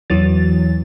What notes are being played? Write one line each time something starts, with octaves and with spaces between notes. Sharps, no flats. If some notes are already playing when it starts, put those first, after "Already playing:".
E2 E3 F#3 A6